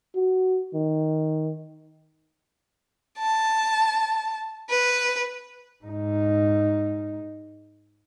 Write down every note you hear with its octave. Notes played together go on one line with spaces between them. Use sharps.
F#4
D#3
A5
B4
G#2 D#4